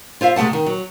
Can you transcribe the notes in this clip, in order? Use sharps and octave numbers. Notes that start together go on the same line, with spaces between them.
F4 C5 E5 F5
C3 G#3 A3 F#5 A5
D#3
F#3